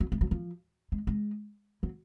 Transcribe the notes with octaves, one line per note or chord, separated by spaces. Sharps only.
F#3
G#3
F#3
F3
G#3
G#3
F#3